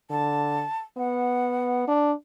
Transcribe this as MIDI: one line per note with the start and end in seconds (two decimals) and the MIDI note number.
0.11 0.65 50
0.11 0.79 81
0.97 1.84 59
0.97 1.85 78
1.88 2.13 62